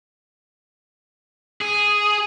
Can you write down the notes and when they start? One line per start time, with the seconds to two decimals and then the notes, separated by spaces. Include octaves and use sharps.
1.62 G#4